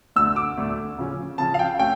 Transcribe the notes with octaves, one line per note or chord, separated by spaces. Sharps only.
D2 D3 A3 E6
D6
D2 D3 A3
C#3 F3 C#4
C#3 F3 C#4 A5
F5
G5
A3 C#4 G5